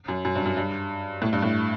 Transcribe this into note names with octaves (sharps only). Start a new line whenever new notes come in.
F#2
F#2
G2
F#2
G2
A2
G2
A2